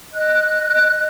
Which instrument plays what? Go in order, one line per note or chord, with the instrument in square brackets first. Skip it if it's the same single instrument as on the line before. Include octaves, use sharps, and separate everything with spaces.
[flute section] D#5 F#6